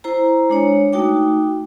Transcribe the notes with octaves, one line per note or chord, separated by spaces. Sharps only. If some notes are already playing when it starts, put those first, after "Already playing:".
E4 C5 A#5
G#3 D4 C#5
A3 D#4 F#4 G5 D6